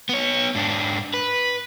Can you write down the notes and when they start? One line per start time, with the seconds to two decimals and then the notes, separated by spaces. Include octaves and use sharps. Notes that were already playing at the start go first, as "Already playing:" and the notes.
0.09 B3 C#5
0.55 G#2 D4
1.14 B4